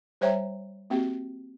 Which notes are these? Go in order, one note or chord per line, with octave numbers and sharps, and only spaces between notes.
G3 C5 C#5 E5 G5 A#5
A#3 C4 F#4 G4